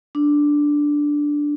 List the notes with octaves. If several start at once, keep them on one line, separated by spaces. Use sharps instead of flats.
D4